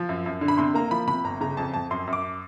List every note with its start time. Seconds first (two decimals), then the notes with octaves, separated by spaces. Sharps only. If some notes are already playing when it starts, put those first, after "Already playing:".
Already playing: F3
0.09 F#2
0.26 F#2
0.41 D3
0.48 B5
0.58 C3 C6
0.74 A#3 A#5
0.91 F3 B5
1.07 C3 B5
1.24 G1 A#5
1.41 C#3 A#5
1.57 F2 A5
1.74 F2 A5
1.91 F#2 C6
2.07 F#2
2.13 D6